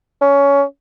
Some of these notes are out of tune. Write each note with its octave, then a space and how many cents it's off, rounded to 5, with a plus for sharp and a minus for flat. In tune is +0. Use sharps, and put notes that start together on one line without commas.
C#4 +20